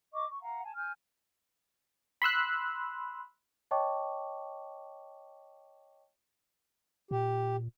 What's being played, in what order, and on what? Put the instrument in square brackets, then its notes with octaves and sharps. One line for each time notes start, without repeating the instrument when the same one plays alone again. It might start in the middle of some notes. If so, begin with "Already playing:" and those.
[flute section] D#5 C#6 D6
C#6
F5 F#5 A#5
G#5 A5
G#5 F6 G6
[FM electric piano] B5 C6 E6 F#6
[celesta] C#5 D#5 G5 A5 C#6 D6
[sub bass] A#2 [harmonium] G4